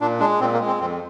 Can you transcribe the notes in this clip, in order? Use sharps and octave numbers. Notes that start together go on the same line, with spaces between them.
A#2 D4
G#3 D4
A#2 C4
A#3
G#3
C4
F2 C4